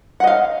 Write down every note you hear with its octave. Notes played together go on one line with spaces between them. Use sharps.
D#5 F5 F#5